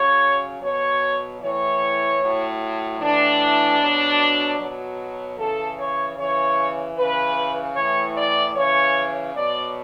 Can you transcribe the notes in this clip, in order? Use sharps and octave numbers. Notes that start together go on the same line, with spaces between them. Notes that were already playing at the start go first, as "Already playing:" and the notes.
Already playing: C#3 F#3 C#5
B2 F#3 C#5
A2 E3 C#5
A2 F#3
A2 E3 D4
B2 F#3
B2 F#3
C#3 E3 A4
C#5
C#3 E3 C#5
C#3 E3 B4
A2 E3 C#5
D5
C#3 E3 C#5
B2 F#3 D5